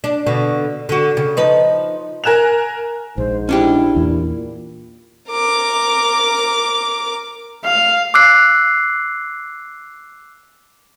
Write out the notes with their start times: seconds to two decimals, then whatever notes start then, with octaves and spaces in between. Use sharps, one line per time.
0.04 D4
0.27 B2 D3
0.89 D3 F#4
1.17 C#3
1.37 F3 D#4 B4
2.24 A#4 G#5 F#6 E7 F7
3.18 A#1 G#2 C5
3.49 C#4 D4 E4 G4
3.96 E2 A#2
5.31 A#4 D6
7.64 F5
8.14 D6 E6 F#6 C7